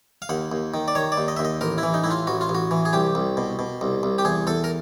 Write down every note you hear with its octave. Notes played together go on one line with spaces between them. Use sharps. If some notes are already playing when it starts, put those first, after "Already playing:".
F5
D#2 F#5
D#2
D#3
D5
D#3 C#5
D5
D#2
D#5
D#2 E5
D#5
A1 A#4
E4
E3
D#4
A2 E4
F4
A1 F#4
F4
A1
F#4
E3
G#4
C2 G4
C2
B2
B2
C2
C2
G4
E2 G#4
E2 A4
A#4